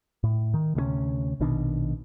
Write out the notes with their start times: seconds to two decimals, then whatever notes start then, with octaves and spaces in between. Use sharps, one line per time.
0.24 A2
0.54 D#3
0.75 D2 C3 G3 C#4
1.40 A#1 B2 D#3 D4